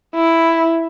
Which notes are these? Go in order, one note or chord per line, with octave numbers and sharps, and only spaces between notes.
E4